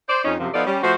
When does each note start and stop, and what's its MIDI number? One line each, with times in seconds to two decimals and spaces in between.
0.08 0.21 72
0.08 0.21 74
0.24 0.34 41
0.24 0.34 61
0.24 0.34 63
0.39 0.48 42
0.39 0.48 48
0.39 0.48 53
0.54 0.65 53
0.54 0.65 59
0.54 0.65 63
0.54 0.65 65
0.54 0.65 69
0.54 0.65 74
0.66 0.80 55
0.66 0.80 61
0.83 0.94 53
0.83 0.94 57
0.83 0.94 66
0.83 0.94 72